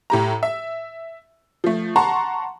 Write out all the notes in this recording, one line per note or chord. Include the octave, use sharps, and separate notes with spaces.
A2 G4 A#5
E5
F3 A3
F#5 A5 A#5 C6 C#6